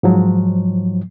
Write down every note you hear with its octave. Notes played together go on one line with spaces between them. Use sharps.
G#2 F3 F#3